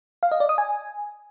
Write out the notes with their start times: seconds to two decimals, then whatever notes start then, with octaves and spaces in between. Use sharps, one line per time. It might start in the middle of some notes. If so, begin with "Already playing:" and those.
0.23 F5
0.31 D#5
0.40 D5
0.49 D#6
0.58 G#5